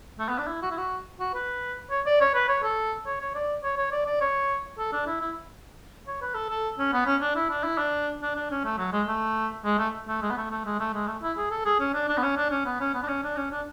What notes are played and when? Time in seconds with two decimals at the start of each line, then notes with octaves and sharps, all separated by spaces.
0.19 A3
0.29 B3
0.38 D4
0.48 E4
0.62 F#4
0.71 E4
0.78 F#4
1.20 F#4
1.34 B4
1.91 C#5
2.06 D5
2.21 C#5
2.34 B4
2.49 C#5
2.63 A4
3.06 C#5
3.21 C#5
3.35 D5
3.64 C#5
3.77 C#5
3.92 D5
4.06 D5
4.21 C#5
4.78 A4
4.93 D4
5.07 E4
5.21 E4
6.07 C#5
6.21 B4
6.35 A4
6.50 A4
6.79 C#4
6.93 B3
7.06 C#4
7.21 D4
7.36 E4
7.50 D4
7.64 E4
7.78 D4
8.22 D4
8.36 D4
8.51 C#4
8.64 A3
8.78 F#3
8.93 G#3
9.08 A3
9.65 G#3
9.79 A3
10.08 A3
10.22 G#3
10.31 B3
10.37 A3
10.51 A3
10.66 G#3
10.80 A3
10.94 G#3
11.07 A3
11.22 E4
11.37 G#4
11.51 A4
11.65 G#4
11.80 C#4
11.94 D4
12.09 D4
12.17 B3
12.23 C#4
12.37 D4
12.51 C#4
12.65 B3
12.80 C#4
12.94 B3
13.03 D4
13.09 C#4
13.24 D4
13.37 C#4
13.51 D4